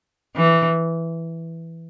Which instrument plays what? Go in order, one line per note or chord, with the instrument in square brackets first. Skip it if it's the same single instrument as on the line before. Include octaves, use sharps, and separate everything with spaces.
[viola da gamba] E3